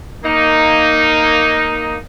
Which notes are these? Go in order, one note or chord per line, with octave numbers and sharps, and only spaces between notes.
A#3 D#4